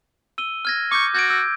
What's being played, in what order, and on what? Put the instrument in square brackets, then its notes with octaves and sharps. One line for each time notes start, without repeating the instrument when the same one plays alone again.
[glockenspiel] E6 D#7 G7
F6 G#6 A#6
[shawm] C#6 [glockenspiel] D6 G6
[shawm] F#4 [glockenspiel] G6 G#6 D7
[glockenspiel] E6 G6